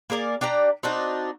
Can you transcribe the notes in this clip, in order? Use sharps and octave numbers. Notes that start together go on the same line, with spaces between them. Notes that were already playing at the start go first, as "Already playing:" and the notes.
A#3 G#4 A#4 D5
D4 G4 D5 A#5
C4 D4 D#4 F#4